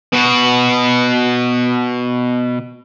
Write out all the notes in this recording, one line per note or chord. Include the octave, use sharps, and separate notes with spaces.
B2 F#4